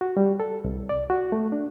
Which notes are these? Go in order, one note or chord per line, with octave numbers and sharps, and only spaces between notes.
F#4
G3
A4
C2
D5
F#4
A3
D4